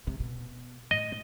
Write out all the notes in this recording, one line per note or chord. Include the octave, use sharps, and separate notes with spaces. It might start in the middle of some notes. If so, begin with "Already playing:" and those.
C3
B2
A2 D#5